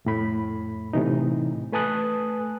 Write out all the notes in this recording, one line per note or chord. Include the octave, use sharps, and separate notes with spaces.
F2 A2 B5
A2 C3 E3 D#4
A3 B4 G#5 A5 D#6 F#6